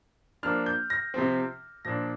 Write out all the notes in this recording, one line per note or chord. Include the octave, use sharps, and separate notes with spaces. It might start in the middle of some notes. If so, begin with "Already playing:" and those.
F3 A#3 D4 F6
G6
A#6
C3 F3 C4
A#2 F3 D4 A#6